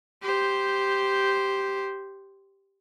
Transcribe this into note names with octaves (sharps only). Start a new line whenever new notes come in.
G4 C5